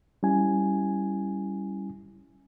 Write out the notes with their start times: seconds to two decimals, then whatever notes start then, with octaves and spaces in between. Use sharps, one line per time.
0.23 G3 C#4 E4 G#5